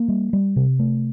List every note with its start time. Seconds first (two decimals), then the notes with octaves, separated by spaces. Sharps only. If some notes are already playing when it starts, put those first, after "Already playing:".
Already playing: A#3
0.08 G3
0.33 G3
0.56 C3
0.79 A3